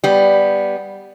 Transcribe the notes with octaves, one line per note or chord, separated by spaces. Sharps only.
G3 B3